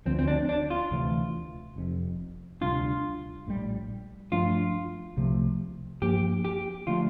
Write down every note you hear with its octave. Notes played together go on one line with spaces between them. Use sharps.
D2 D3 F3 C4
C4
D4
D4
F4
D2 C3 E3 A3
F1 F2 C3
D2 C3 G3 D4 F4
A#1 A2 E3 G3
G2 F3 A3 D4 F4
C2 C3 F3 A3
G2 F3 A#3 G4
G4
D3 F3 A3 F4